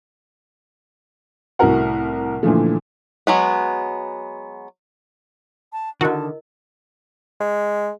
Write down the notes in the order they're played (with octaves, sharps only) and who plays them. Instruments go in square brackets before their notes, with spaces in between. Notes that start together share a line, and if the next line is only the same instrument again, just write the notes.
[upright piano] C2 A2 F#4 A#4 F#5
A#2 D3 E3 F3 A3
[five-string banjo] F#3 G#3 B3
[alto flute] A5
[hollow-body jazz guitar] D3 D#3 [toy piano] E4 A#4 D#5 [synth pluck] F#4 [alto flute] A5
[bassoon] G#3